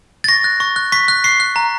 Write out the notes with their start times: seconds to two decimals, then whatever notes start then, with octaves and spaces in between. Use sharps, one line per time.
0.24 A6
0.28 C#6 A#6
0.44 F#6
0.60 C#6
0.76 F#6
0.92 C#6 B6
1.08 F#6
1.24 C#6 C7
1.40 F#6
1.56 A#5